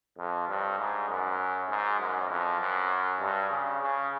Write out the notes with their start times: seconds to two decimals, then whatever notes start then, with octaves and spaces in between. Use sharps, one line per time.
0.18 F2
0.48 G2
0.79 G#2
1.09 F#2
1.70 G#2
2.00 F#2
2.30 F2
2.61 F#2
3.21 G2
3.51 C#3
3.82 C#3